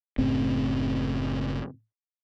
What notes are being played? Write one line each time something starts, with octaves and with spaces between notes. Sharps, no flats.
F#1 A2 C#3 C4